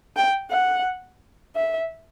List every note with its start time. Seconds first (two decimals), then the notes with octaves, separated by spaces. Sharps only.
0.16 G5
0.51 F#5
1.56 E5